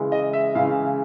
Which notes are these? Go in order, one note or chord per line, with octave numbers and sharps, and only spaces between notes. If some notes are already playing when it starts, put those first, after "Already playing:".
Already playing: C#3 E3 G#3
D#5
E5
C#3 E3 G#3 F5